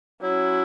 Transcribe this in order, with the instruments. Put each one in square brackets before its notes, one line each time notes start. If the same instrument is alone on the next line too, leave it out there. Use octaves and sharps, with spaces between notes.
[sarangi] F#3 [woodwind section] C#4 E4